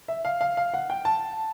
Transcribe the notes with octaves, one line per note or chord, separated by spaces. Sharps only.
E5
F5
F5
F5
F#5
G5
A5